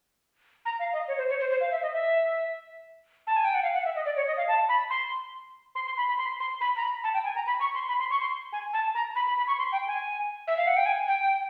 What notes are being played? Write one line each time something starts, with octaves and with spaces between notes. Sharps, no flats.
A#5
F5
D#5
C#5
C5
C#5
C5
C5
F5
E5
D#5
E5
A5
G#5
G5
F#5
F5
F#5
E5
D#5
D5
C#5
D#5
F5
A5
B5
C6
C6
C6
B5
B5
C6
C6
B5
A#5
B5
A5
G5
G#5
A#5
B5
C#6
C6
B5
C6
C#6
C6
G#5
A5
A#5
B5
B5
B5
C#6
C6
G5
G#5
E5
F5
F#5
G5
G#5
G5